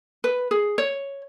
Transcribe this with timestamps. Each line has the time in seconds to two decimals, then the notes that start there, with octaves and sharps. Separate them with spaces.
0.24 B4
0.51 G#4
0.78 C#5